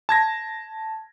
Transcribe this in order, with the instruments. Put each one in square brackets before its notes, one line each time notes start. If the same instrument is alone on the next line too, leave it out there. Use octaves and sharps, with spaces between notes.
[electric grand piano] A5 G#6 A#6